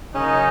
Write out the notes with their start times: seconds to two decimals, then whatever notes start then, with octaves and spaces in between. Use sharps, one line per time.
0.14 C#3 F#3 A#3 C#4 D#4